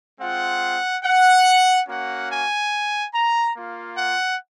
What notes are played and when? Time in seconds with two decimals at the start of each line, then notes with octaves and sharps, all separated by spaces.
0.21 G#3 C4 F4 F#5
1.04 F#5
1.88 A#3 C#4 F#4 F#5
2.30 G#5
3.14 A#5
3.55 A#3 F4
3.97 F#5